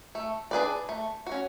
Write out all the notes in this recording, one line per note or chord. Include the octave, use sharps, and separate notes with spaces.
A3
D4 G#4 B4 D5
A3
C#4 F#4